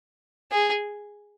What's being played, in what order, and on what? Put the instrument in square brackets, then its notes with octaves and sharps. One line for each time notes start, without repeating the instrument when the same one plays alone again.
[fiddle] G#4